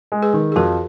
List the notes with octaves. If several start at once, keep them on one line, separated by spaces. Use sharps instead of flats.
G#3
G#4 B4
D#3
G#4
F2 F#4 A#4